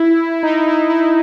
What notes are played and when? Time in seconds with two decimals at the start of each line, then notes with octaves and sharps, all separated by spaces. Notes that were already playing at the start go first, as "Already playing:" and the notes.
Already playing: E4
0.43 D#4
0.66 E4
0.90 E4